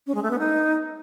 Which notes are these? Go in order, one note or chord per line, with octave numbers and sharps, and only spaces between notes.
C#4
G#3
A3
B3
D#4